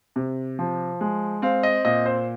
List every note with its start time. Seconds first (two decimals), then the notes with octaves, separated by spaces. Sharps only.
0.16 C3
0.59 F3
1.01 G#3
1.42 C4 F5
1.63 D#5
1.85 A#2 D#5
2.06 C5